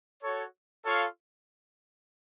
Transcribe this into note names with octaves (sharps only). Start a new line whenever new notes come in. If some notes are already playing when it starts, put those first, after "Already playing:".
F#4 A4 C#5
F4 A4 C#5 F5